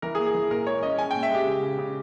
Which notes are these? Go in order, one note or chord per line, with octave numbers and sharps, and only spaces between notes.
E3 A#4
G#4
A#3
G#4
E3
A#2 A#4
G#3 C#5
C#4 D#5
G#3 G#5
A#2 G5
E5
G#3 G4
C#3
C#3
C#3